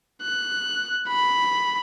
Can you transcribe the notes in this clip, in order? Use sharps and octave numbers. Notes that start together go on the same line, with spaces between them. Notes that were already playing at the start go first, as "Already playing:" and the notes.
F#6
B5